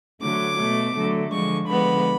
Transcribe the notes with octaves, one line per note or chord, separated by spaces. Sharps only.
D3 F#3 A3 D6
B2 A3
D3 F#3 A3
D3 F3 G#3 C#6
D3 F3 G#3 B3 B5